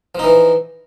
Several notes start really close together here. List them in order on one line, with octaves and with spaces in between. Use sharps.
F3 D#4 E3